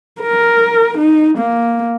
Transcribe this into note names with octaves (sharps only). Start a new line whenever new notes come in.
A#4
D#4
A#3